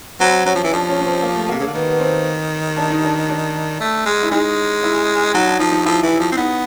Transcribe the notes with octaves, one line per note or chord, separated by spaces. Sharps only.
F#3 C4
F#3 C#4
F3
E3
F3 D4
C#4
C#4
C4
A#3
A3
C3 A#3
C#3 A#3
D3
D#3 B3
B3
C4
D4
D#4
D4
D4
A3
G#3
E4
G#3 D#4
E4
F#3 D#4
D4
F3 D#4
D#4
F3 E4
E3 E4
F3
C4
B3 D#4